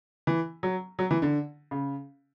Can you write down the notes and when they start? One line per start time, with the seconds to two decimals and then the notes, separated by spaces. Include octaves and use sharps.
0.27 E3
0.63 F#3
0.99 F#3
1.11 E3
1.22 D3
1.71 C#3